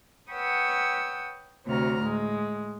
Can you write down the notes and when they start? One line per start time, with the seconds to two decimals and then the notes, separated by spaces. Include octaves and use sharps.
0.31 B4 C#5 F#5 G5 D#6 E6
1.66 D2 C3 F#3 A#5 F6
2.01 A2 G#3